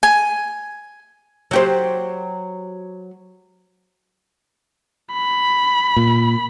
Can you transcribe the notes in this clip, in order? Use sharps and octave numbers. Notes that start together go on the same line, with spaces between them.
G#5
F#3 G4 C5
B5
A#2